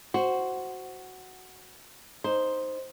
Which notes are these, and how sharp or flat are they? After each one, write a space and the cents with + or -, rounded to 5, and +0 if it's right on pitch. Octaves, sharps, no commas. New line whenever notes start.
F#4 +0 C5 +0
D#4 +0 C5 +0